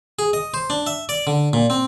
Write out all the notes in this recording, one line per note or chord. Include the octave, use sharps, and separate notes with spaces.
G#4
D#5
C5
D4
E5
D5
D3
A#2
C4